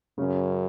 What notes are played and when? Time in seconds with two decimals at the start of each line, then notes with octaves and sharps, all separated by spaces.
0.18 F#2 C#3 C#4